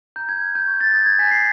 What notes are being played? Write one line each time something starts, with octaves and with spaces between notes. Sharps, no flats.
A#5 G6
G#6
F6
G6
C#6
A6
D#6 G#6
G#6
G#5 B6
C7